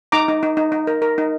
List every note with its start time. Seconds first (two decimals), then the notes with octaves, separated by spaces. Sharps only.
0.12 D#4 A#5 D6
0.28 D#4
0.43 D#4
0.57 D#4
0.72 D#4
0.87 A#4
1.02 A#4
1.18 D#4